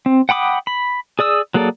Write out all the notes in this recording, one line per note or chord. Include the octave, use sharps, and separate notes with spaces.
C4
F#5 G5 B5 D6 D#6
B5
G#4 D5 D#6 E6
F#3 A#3 G#4 A4 D5